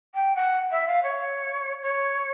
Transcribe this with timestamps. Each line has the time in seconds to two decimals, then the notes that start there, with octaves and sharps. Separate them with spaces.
0.14 G5
0.35 F#5
0.71 E5
0.87 F5
1.03 C#5
1.82 C#5